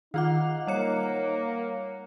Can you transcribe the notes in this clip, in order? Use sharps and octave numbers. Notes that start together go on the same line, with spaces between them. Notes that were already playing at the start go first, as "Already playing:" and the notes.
D#3 D#4 F4 F5 F#5 D6
G3 A#3 C#5 C#7